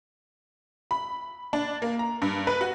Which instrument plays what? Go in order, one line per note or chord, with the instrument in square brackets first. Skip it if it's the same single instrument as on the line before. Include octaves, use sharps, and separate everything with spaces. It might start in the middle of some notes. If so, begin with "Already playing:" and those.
[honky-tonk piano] B5
D4
A#3
A#5
G2
B4
F#4